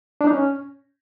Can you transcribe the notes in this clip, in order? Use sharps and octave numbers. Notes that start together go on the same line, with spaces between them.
D4
D#4
C#4